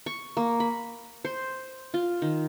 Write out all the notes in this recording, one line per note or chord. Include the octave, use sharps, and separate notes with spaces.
C#6
A#3
B5
C5
F4
D#3